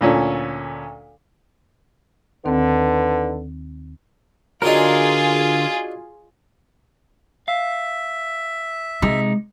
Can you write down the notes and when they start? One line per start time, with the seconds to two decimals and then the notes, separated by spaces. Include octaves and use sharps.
0.01 D2 A#2 C#4 A4
2.45 D#2 D3 D#3 C4 D#4 B4
4.62 D3 F#3 D4 D#4 F4 G#4 A#4
7.48 E5 F5
9.02 C3 G#3 D#4